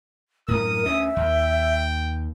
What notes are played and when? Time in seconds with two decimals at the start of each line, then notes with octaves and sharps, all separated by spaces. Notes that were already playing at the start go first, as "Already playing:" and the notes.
0.48 F#2 A2 A#4 D#6
0.85 D2 C#4 E5
1.16 D#2 G5